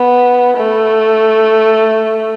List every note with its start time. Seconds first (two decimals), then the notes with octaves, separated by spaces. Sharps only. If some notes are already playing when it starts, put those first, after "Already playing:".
Already playing: B3
0.57 A3